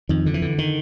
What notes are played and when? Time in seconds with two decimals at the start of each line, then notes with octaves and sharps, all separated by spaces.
0.09 F2 D#3
0.26 D3
0.34 E3
0.42 D3
0.58 D#3